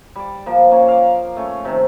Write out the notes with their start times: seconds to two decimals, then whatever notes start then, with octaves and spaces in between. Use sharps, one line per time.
0.16 G3 D5
0.46 F3 A#3
0.71 A#3 C#4
0.88 F5 D6
1.36 A3 C#4
1.65 C3 D#3